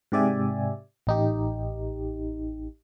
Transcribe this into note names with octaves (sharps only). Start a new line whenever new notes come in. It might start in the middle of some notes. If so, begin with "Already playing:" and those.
G#2 C3 G4 D5 E5 G#5
A1 D#4 G4